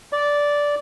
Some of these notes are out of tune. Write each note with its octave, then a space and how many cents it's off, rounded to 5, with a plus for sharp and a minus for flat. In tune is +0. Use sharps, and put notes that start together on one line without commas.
D5 -10